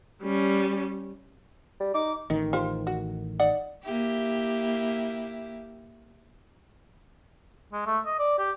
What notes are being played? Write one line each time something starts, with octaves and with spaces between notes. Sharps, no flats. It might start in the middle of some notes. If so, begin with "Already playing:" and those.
G3 C#4
G3
D#4 D6
A1 D#3 D#4
F4 G4 C5
F#4
D#4 D5 F#5
A#3 E4 G4
G#3
A3
D#5
D5
G4